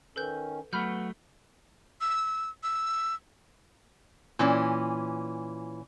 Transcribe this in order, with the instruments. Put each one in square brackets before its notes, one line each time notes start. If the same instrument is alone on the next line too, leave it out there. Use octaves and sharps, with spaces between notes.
[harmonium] D#3 C#4 [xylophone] A4 B4 G6
[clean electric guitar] F#3 A3 [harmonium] B3 [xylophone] B5 F6 G6
[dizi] E6
E6
[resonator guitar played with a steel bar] A#2 E3 C#4